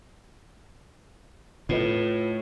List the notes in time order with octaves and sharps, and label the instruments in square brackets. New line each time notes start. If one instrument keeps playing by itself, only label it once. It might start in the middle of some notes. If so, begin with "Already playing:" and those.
[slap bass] A2 [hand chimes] F4 B4 D#5